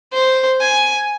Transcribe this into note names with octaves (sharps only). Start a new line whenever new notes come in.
C5
G#5